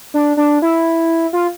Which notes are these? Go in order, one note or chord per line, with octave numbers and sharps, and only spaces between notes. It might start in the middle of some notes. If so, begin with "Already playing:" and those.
D4
D4
E4
F4